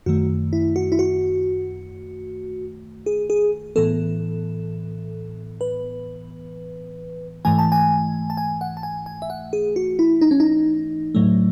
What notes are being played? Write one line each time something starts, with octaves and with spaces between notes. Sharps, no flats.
F#2 D#3 A3 F#4
E4
F#4
E4
F#4
G#4
G#4
A2 E3 B3 A4
B4
G#2 E3 A3 G#5
A5
G#5
A5
G#5
F#5
A5
G#5
G#5
E5
F#5
G#4
F#4
E4
D#4
C#4
D#4
A2 F#3 A3